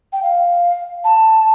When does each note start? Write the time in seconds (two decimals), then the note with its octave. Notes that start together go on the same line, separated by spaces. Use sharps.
0.13 G5
0.23 F5
1.04 A5